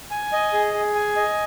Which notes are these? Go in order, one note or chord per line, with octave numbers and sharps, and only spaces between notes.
G#5
D#5
G#4
G#4
G#5
D#5